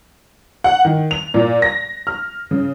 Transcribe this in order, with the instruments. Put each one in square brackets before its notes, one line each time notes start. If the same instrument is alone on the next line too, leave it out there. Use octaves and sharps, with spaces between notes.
[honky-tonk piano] F#5
D#3
F7
A#2
A#6
F6
C#3